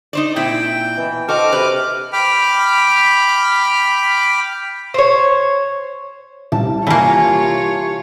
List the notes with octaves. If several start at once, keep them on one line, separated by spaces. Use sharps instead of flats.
D#4 C5 D5
A#2 C4 E4 G5
B2 E3
C4 F#4 A4 D#5 D6 F6
C3 B4
G5 B5 D6 F6
C5 C#5
C2 A5
E3 A#3 F4 G4 C#5 G#5 A5